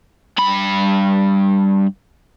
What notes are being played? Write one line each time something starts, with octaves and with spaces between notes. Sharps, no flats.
G2 B5